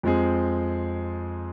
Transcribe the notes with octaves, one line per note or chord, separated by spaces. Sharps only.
F2 F3 G#3 C4 G#4